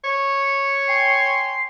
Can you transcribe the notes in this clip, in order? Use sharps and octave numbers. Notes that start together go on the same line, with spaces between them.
C#5
G5 G#5 C6 C7